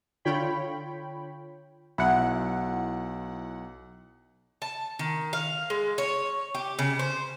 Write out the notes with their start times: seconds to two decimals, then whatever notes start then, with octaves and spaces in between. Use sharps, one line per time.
0.25 D3 F4 C#5 G5 B5
1.98 B1 E4 F#5
4.62 A5
4.99 D#3
5.33 F5
5.70 G#3
5.98 C#5
6.55 G4
6.79 C#3
6.99 C5